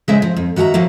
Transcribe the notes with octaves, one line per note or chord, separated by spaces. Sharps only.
C#3 G#3 E4 G#4 C5 E5
F3
F2
D#3 F#4 E5 G5 A#5
F3 F#3 A#3 E4